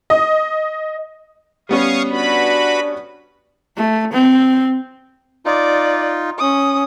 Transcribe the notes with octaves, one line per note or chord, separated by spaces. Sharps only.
D#5
G3 B3 C#4 F5 C#6 D#6
D4 F#4 B4 B5
A3
C4
D#4 F4 D5
C#4 D#6